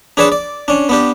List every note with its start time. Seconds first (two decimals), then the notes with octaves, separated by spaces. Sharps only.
0.17 D4 G#4 B4 C#5 D5 A5
0.32 D5
0.68 C#4 D4
0.89 B3 D4 G4